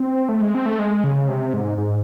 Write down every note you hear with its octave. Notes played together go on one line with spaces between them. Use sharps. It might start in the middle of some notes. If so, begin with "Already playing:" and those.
Already playing: C4
A3
G#3
C4
A3
G#3
C#3
C3
G#2
G#2